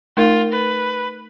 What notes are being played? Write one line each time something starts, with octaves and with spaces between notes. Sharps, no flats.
A3 D#4 F4 A#4
B4